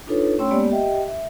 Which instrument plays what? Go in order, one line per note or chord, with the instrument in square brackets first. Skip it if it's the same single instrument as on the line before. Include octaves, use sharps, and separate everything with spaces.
[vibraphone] D4 D#4 F4 A4 B4 C#5
A3 C#4 C#5 G5 C6 E6
G#3 A#3 B3 G4 D5
G4 D#5 E5 G5
E5